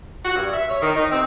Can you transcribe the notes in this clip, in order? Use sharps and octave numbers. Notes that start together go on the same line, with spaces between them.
F#4
G2
E5
C#5
D#3
D#4
C4